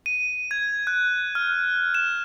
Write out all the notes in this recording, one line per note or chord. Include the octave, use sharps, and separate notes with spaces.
D#7
G#6
F#6
F6
E7